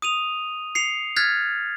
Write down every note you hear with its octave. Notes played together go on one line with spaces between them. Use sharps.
D#6 D#7 F7
C7 C#7 F7
F6 F#6 G#6 A6 B6